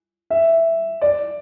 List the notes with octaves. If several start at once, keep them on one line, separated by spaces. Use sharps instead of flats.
E5
D5